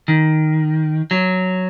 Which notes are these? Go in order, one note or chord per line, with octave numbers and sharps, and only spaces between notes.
D#3
F#3